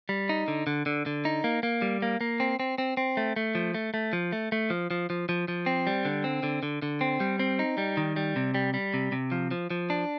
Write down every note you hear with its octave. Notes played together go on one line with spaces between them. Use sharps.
G3
D#4
D3
D3
D3
D3
D#4
A#3
A#3
G3
A#3
A#3
C4
C4
C4
C4
A3
A3
F3
A3
A3
F3
A3
A3
F3
F3
F3
F3
F3
C4
G3
D3
C4
D3
D3
D3
C4
G3
C4
D#4
G3
D#3
G3
C3
G3
G3
C3
C3
F3
F3
F3
D4